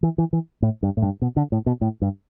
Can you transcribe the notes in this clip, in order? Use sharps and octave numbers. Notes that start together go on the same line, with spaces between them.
E3
E3
E3
A2
G2
A2
G2
B2
D3
A2
B2
A2
G2